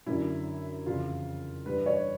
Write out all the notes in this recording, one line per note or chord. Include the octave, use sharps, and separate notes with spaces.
F#2 D3 E4
F2 C#3 E3 F4
G2 E3 B4
C#5